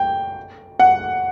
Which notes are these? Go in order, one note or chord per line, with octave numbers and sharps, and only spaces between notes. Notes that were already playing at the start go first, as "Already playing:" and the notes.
Already playing: G5
F#5